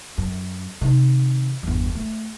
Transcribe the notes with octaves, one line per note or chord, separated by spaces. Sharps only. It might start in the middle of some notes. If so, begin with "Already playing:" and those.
F#2
C3 D#3
G1 E2
A3